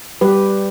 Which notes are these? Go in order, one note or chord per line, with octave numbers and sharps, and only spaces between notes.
G3 G4 B4